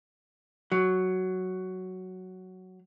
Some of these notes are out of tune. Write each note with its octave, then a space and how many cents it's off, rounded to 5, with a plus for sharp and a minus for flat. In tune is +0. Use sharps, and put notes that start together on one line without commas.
F#3 +5